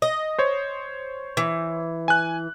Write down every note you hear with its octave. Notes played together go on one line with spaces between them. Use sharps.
D#5
C5 C#5
E3
G#5 F#6